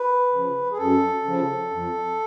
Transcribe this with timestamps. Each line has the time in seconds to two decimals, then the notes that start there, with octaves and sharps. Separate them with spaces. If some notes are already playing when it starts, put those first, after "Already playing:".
Already playing: B4
0.32 C#3 F3
0.71 G#4
0.78 F#2 A4
1.24 C#3 F3
1.71 F2